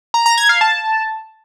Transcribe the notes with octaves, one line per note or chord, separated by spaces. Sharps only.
A#5
A#5
G#6
F5
A5